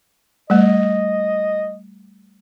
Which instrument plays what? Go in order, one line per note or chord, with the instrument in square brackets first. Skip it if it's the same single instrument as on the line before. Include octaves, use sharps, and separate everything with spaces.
[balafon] G3 A3 [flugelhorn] D#5